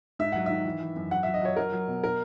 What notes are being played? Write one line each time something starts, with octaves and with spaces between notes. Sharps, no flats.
G#2 E5
F#3 F#5
D#3 E5
E3
E3
F#2
F#3 F#5
E5
F#3
D#5
F#3 C#5
F#3 A#4
F#3
B2
A#4